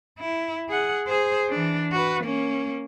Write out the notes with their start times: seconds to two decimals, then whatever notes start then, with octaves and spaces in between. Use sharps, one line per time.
0.19 E4
0.69 G#4 F#5
1.07 G#4 C5
1.49 E3 D4
1.92 F#4 B4
2.24 A#3 C#4